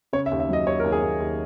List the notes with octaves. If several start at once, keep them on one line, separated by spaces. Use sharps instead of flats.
C#3 C#5
E5
D#2
E5
F#3 D#5
D#2 C#5
A#4
D#2
G#4
D#2
D#2